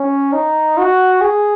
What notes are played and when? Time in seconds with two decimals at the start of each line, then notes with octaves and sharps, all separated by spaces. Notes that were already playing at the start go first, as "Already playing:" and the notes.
Already playing: C#4
0.33 D#4
0.77 F#4
1.21 G#4